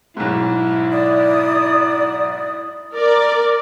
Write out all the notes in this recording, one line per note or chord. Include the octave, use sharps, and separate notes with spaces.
B1 G#2 E4
D5 D#6
A#4 D5